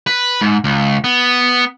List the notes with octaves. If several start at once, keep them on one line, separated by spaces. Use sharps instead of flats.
B4
G#2
C#2
B3